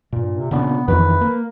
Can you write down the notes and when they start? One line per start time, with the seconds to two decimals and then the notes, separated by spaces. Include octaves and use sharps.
0.13 G2 A#2
0.37 C3
0.51 A#2 C#3 B3 D4
0.88 F2 D#3 E3 B4
1.21 A#3